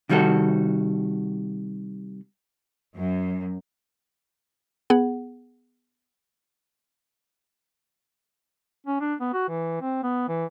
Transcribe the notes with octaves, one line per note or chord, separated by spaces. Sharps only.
C3 D#3 G3 F4 F#4 A4
F#2
B3 G#4 F#5
C#4
D4
B3
F#4
E3
C4
B3
E3